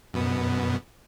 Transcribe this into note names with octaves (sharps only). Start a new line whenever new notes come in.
F#2 B2 B3